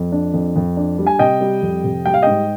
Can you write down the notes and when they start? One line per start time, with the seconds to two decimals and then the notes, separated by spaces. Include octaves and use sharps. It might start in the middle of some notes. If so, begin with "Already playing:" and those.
Already playing: F2
0.12 D4
0.34 F2
0.56 F2
0.77 D4
0.98 G3
1.07 G#5
1.19 C3 D#5 G5
1.41 G3
1.62 F2
1.84 C3
2.06 G3 G5
2.14 F5
2.22 G#2 D#5 G5